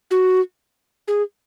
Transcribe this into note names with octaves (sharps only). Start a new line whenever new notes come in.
F#4
G#4